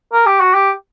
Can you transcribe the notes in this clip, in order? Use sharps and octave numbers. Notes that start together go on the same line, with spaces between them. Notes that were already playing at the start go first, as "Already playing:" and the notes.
A#4
G4
F#4
G4